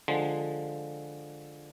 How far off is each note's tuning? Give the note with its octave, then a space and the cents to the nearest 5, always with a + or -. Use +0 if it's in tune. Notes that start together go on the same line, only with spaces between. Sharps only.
D3 +10 F3 +0 G#3 +0